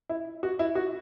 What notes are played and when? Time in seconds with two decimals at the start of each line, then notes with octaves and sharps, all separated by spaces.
0.09 E4
0.43 F#4
0.59 E4
0.75 F#4